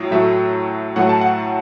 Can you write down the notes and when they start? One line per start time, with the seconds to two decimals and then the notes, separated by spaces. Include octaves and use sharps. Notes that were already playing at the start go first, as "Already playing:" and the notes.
Already playing: A2 F#3
0.11 A2 F#3 A3 E5
0.96 A2 F#3 A3 F#5
1.09 A5
1.21 F#5